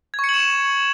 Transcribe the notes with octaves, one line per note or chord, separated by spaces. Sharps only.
G#6
C#6
C#7
F#7
E7